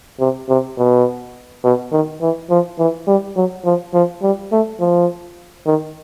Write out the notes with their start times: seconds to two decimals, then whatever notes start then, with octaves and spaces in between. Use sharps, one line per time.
0.20 C3
0.49 C3
0.78 B2
1.64 B2
1.92 D#3
2.21 E3
2.50 F3
2.78 E3
3.07 G3
3.36 F#3
3.65 F3
3.94 F3
4.22 G3
4.52 A3
4.80 F3
5.66 D#3